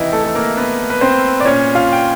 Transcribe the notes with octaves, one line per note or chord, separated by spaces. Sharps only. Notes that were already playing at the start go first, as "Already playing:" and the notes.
Already playing: C3 D#3 E3 D#4 E4
A3 A4
A4
A#3 A#4
B3 B4
B4
C4 C5
D5
A#2 C#4 C#5
F4 F5
G5